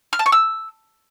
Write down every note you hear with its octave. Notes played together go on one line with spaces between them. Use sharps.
F6
A5
C#6
E6